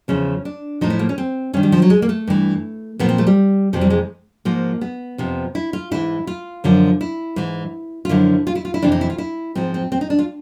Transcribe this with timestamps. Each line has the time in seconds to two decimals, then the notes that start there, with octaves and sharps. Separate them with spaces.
0.08 E2 C#3 F3 C#4
0.45 D4
0.81 A2 F3 D#4
0.90 E4
0.99 A#3
1.09 C#4
1.18 C4
1.53 G2 D#3 C#4
1.63 G3
1.72 F3
1.82 F#3
1.90 G#3
2.02 A#3
2.09 A3
2.27 G2 E3
2.99 A#2 F3 B3
3.09 C4
3.18 A3
3.27 G3
3.73 F2 C3 E3 F3
3.81 G3
3.90 G#3
4.45 G#2 F3 A#3
4.81 B3
5.18 F2 C3 F3
5.55 E4
5.73 F4
5.91 G#2 E3 E4
6.27 F4
6.64 F#2 D3 F3
7.01 E4
7.36 G#2 E3
8.05 F4
8.09 F#2 D3 F3 E4
8.47 F4
8.55 E4
8.65 F4
8.74 E4
8.82 F2 C3 E3 D4
8.92 D#4
9.01 E4
9.10 F4
9.18 E4
9.55 G#2 F3 C4
9.74 C4
9.92 C4
10.01 D#4
10.10 D4
10.19 F4